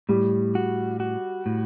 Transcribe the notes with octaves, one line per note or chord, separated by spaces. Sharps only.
A2 G3
F#4
F#4
A2